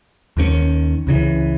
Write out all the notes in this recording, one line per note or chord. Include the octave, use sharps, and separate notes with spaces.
D#2 D#3 A3 C#4
C#2 C#3 E3